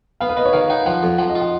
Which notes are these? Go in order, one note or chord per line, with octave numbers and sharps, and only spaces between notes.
B3 F5
B4
B3 D#5
C#5
D#3 F5
D#4 F#5
F3 F#5
F2
F3 F#5
D#5
F4
F#5